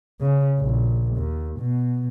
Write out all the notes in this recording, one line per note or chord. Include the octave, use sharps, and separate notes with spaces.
C#3
A#1
D#2
B2